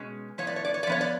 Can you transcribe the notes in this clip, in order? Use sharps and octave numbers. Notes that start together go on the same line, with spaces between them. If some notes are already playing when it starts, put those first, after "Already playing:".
Already playing: B2 G#3 C#4
A2 F3 B3 C#5
D5
C#5
D5
C#5
D5
F3 B3 C#5
D5